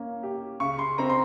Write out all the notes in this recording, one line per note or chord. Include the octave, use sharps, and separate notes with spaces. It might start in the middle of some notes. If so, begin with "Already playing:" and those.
Already playing: A#3 C#4
G4
C#3 C#6
C6
C4 A#5
C6